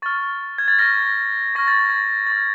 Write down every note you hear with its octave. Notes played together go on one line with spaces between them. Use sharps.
C#6 F6 A6
G#6
A6
C#6 F6 A#6
C#6 F6 A#6
A6
G#6
A6
A6
C#6 F6 G#6